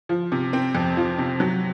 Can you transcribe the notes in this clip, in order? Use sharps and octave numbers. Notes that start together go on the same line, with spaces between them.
F3
C3
C4
F2
F3
C3
F#3